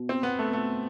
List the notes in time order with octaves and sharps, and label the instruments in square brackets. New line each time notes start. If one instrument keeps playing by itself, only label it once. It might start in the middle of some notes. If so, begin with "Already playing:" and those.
Already playing: [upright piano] B2
[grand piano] C4
B3
A3
A3